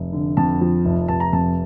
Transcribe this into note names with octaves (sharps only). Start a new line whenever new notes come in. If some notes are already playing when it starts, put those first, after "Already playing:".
Already playing: F1
D3
F2 A5
F3
F1
F1 A5
A#5
F2 A5